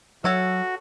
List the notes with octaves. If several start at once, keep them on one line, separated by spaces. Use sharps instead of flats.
F#3 F#4 A4 C#5 E5